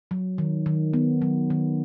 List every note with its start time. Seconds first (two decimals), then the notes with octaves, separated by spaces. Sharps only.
0.11 F#3
0.38 D#3
0.66 D#3
0.93 B3
1.22 F#3
1.50 D#3